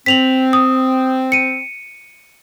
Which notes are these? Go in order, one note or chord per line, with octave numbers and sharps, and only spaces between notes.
C4 B6 F7 F#7
D#6
C#7 D#7